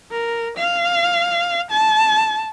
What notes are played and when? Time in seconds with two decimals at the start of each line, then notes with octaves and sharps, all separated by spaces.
0.11 A#4
0.57 F5
1.71 A5